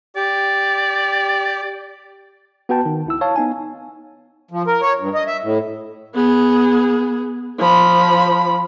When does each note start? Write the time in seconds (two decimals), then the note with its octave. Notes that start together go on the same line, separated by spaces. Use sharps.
0.16 G4 D5
2.69 B3 F#4 B4 G5 A5
2.86 D#3
3.06 C#2 E4 E6
3.21 C#5 F5 A5
3.36 B3 D#4 G#5
4.51 F3
4.67 A#4
4.82 C#5
4.99 G2
5.14 D#5
5.27 E5
5.43 A2
6.15 B3 G#4
7.59 F3 B5